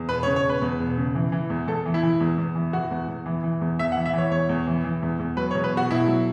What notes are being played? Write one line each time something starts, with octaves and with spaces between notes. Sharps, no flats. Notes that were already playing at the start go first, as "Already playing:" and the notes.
Already playing: E2
E1 B4
C#5
C#3
C#5
E1
B4
E2
E1
C#3
E3
E3
E2
E2 A4
E3
E4
E3
E2
E2
E3
E3 F#4
E2
E2
E3
E3
E2
E2 E5
F#5
E3
E5
E3 C#5
E2 C#5
E2
E3
E3
E2
E2
F#3 B4
C#5
E2
B4
E1
F#4
B2 E4
F#3